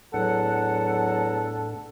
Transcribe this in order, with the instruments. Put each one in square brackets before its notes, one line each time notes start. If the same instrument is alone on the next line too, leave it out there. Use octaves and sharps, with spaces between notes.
[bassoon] E2 [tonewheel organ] A2 D4 [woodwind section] F#3 F#5 [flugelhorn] A4